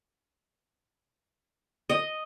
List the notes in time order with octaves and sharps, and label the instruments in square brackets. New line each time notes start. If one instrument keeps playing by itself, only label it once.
[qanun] D#5